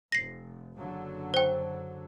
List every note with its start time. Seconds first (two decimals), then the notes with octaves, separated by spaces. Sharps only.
0.12 F1 A#6 C7
0.78 F#1 D3 F#3
1.34 C5 G5